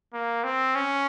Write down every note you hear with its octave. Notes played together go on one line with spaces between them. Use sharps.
A#3
C4
C#4